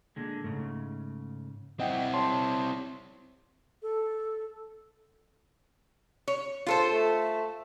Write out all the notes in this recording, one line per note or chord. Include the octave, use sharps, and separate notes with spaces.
A#2 D3 G#3
G#2 C#3 A3
C4 E4 D#5 F#5 G5
G4 C#5 A5 C6
A4
C#5
F4 A4 C5
A3